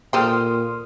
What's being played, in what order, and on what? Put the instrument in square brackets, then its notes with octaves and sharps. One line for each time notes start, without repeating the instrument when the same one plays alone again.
[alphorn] A#2 [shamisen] A4 C5 G5 [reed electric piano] C6 D#6 F6